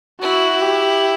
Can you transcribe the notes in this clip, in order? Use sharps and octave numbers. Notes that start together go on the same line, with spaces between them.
E4 F#4
G4